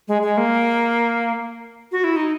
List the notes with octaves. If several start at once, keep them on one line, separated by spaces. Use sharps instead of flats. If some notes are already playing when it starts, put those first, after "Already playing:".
G#3
G#3
A#3
F#4
E4
D#4